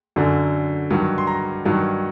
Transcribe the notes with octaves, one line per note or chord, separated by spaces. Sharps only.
F#2 D3 F#3
G2 D#3 F#3
C6
A#5
G2 D#3 F#3